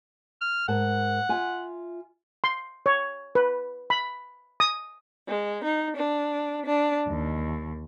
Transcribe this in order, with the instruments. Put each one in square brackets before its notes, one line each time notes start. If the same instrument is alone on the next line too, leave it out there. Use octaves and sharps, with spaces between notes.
[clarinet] F6
[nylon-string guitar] G#2 A#4 A5 [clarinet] F#5
[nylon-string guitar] F4 E5 G#5
[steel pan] C6
C#5
B4
B5
D#6
[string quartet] G#3
D#4
D4
D4
D#2